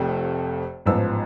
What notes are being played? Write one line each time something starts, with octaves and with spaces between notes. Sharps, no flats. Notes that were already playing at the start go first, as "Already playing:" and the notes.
Already playing: F1 F2 C3 F3 A3
A1 G#2 F3 B3 E6